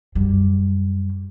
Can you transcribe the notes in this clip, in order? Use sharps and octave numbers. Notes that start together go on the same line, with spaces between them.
F#2 G3